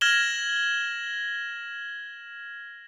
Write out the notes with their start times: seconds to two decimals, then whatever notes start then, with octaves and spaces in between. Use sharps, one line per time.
0.01 F6 G#6 A#6 E7 F#7 G7